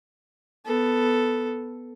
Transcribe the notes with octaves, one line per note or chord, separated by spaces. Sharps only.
B3 A4